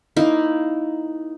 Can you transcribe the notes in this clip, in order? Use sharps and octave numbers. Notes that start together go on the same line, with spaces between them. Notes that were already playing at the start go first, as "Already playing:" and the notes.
A#3 D#4 E4